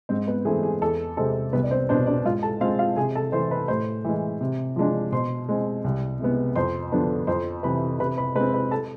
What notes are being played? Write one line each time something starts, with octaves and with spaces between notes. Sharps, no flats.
G#2 C4 C5
B3 B4
E3 A3 C4 G#4
G#4
E2 A4
C3 G#3 C4 A4
C2 B3 B4
D5
C4 C5
B2 B3 C4 D4 C5
D4 D5
G#2 F4 F5
A4 A5
G#3 C4 F4 F5
F4 F5
C3 G#4 G#5
A4 A5
E3 A3 C5 C6
B4 B5
A2 C5 C6
E3 G#3
C3
F3 G#3 D4
B2 C5 C6
G#3 C4
C2
C3 G#3 B3
F2 C5 C6
D3 F3 B3 D4
F2 C5 C6
C3 E3 B4 B5
C3 B4 B5
B4 B5
G#3 B4 B5
C4
B4 B5
A4 A5